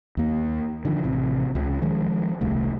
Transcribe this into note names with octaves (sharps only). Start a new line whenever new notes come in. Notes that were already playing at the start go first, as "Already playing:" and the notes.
D#2 A#3
D3 D#3 F3
A1 C3
C#2 C#3
D#3 F3 G#3
D#1 C2 A3